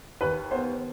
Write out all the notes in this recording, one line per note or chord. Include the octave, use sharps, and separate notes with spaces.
D#2 B4
B3 C5